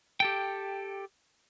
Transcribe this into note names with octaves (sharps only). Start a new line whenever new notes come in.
G4 A4 G5